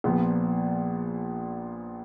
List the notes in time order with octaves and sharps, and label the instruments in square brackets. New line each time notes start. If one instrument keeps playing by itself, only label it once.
[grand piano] A#1 A#2 F3 B3